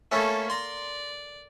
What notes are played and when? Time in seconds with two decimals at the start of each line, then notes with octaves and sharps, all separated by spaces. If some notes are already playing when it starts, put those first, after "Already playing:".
0.12 A3 A#3 C#4 E4 A4
0.50 D5 A#5 C6